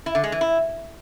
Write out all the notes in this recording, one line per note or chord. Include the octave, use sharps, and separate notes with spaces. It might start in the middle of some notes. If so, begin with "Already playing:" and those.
E4
D3
G#3
E3
E4